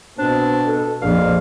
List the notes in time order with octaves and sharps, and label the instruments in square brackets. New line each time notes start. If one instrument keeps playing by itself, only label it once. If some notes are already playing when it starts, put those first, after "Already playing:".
[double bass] B2 [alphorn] C4 [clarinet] D4
[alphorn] A4
[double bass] A#1 F2 [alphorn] A#2 [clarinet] F5